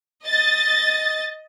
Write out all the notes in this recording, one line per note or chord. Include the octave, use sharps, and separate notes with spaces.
D#5 A6